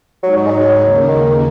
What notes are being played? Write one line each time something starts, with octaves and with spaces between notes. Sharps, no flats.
G#2 F#3 G#3 D#4
F#3
G#3
F#3
D#2 C#3 A#3
D#3